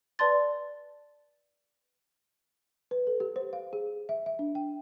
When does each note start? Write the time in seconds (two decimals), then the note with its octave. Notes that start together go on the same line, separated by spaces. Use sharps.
0.19 B4 D5 A5 C6 A6
2.91 B4
3.07 A4
3.20 G4
3.36 C5
3.53 F5
3.73 G#4
4.09 E5
4.26 E5
4.39 D4
4.55 G5